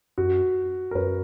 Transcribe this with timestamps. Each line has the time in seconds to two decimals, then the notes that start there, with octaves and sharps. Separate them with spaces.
0.18 F#2 F#4
0.91 A#4
0.95 F#2 B4